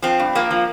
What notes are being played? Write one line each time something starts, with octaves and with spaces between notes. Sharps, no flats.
F3 C4
G2
F3 A#3
F3